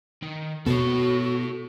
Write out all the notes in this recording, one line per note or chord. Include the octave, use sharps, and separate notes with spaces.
D#3
B2 B3 F#4 A4 C#5